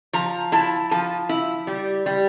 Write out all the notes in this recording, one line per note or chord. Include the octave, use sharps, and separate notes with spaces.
F3 A#5
E4 A5
F3 A5
E4
G3
G3